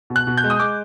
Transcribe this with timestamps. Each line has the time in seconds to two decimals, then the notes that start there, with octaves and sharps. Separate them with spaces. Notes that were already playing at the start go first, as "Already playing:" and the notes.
0.10 B2
0.16 F#6
0.27 B2
0.37 G6
0.44 G#3
0.50 D#6
0.60 G#3 D6